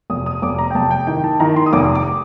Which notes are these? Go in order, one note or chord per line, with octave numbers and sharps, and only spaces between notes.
F1 D#6
D#6
F1 D6
A#5
G5
F1 A5
G5
D#3 G5
A5
D#3 A#5
C6
D#6
F1 D6
D6